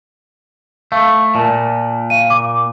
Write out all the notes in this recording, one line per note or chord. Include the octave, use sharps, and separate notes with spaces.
A3 F5
A#2 A5
F5 D#7
D6